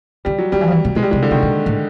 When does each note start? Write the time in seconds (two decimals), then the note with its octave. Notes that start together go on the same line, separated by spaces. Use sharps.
0.25 D3 G3
0.38 F#3
0.52 D#3 G3
0.61 E3
0.68 F3
0.72 E3
0.85 A#2
0.95 B2 G#3
1.03 G3
1.11 C3 G#3
1.22 D3
1.31 C3 D#3
1.42 B2
1.66 A2